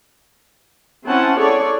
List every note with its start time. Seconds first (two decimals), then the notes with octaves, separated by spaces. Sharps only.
1.07 C4 C#4 E4 F#5 A5
1.39 E4 G#4 A4 C#5 D5